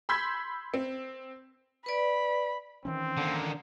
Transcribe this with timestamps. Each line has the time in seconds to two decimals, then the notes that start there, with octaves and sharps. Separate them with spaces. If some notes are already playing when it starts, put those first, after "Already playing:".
0.09 B5 C6 E6 G6 G#6 B6
0.74 C4
1.86 B4 D5 B5
2.85 D#3 E3 C4 C#4
3.17 D3 A#3